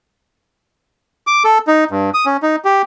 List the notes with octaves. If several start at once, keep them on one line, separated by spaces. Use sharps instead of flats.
D6
A4
D#4
G2
D#6
C#4
D#4
G4